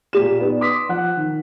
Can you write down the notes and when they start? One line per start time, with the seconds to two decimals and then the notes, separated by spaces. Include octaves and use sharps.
0.13 A#2 G4 E7
0.40 B3 D#4 D5
0.61 C6 D6 D#6 B6
0.89 F3 F#5 F#6
1.17 D#3